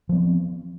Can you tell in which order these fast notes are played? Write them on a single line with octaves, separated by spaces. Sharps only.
F3 B3 C4